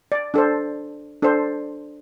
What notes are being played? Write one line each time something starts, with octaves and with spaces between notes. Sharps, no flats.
D5
D4 A4 C5
D4 A4 C5